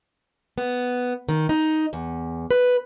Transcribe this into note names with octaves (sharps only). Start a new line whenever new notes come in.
B3
D#3
D#4
E2
B4